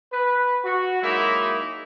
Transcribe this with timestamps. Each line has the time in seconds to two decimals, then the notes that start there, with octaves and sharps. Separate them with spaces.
0.13 B4
0.65 F#4
1.03 F#3 G#3 A#3 D#4 E4